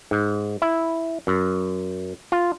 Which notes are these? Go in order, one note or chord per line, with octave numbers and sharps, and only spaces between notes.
G#2
E4
F#2
F4